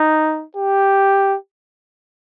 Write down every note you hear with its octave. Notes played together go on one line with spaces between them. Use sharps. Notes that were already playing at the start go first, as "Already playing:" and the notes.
Already playing: D#4
G4